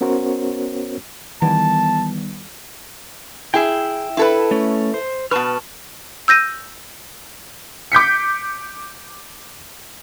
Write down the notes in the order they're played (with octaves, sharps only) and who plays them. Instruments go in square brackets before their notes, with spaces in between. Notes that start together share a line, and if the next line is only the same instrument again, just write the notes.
[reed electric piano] B3 C#4 F#4 A#4 C5 C#5
[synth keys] D#3 G3 B3 [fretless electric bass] E3 [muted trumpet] A5
[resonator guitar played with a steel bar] E4 G#4 [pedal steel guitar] E5 G5
[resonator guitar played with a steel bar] E4 A4 B4
[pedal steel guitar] A3 C#4
C5
[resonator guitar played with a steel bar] B2 B4 [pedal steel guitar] A5 C#6 F6
[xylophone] E6 G6 A#6 D#7
[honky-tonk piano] D6 G6 B6 C#7